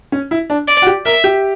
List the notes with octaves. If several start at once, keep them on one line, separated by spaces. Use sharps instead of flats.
C#4
E4
D4
D5
F#4
G4
A#4 E5
G4